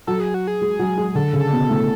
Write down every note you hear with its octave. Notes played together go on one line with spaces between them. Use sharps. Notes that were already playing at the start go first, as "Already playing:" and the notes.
F#3 A4
G#4
F#4
G#4
G#3
F#3
G#3
D3 A4
C#3
B2
A2